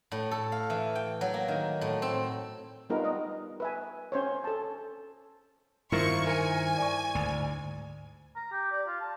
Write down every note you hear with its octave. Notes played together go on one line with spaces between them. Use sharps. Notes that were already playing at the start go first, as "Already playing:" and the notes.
A2
A4
F5
E3
G5
F#3
A#3
D#3
A2
C4
G3 B3 D#4 F4 A#4 B4
D#5
B4 E5 G#5
C#4 C5 C#5
A4 A5
G2 D#3 E4 F4 A#4 C5 C#6
A#4 G#5
D5 C#6
D2 G#2
A#5
G4
D5
F4
A5